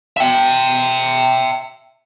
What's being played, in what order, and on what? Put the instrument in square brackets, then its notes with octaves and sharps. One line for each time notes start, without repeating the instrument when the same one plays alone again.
[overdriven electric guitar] E5 G5